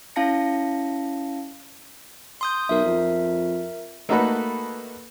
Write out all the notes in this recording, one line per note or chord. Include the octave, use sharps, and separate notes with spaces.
C#4 E4 F5 A5 A#6 C#7
C6 D#6 G6
B1 A#4 E5
F2
A3 A#3 D#4 F#4 A4 B4